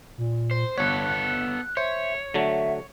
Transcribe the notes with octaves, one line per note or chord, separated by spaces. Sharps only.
A#2
C5
G1 B3 A4 C#5 F#6
C5 C#5 E5
D3 F#3 A3 E5